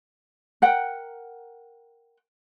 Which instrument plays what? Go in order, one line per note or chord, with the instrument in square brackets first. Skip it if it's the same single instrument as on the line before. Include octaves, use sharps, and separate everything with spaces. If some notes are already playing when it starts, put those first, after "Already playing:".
[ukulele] A#4 F#5 G5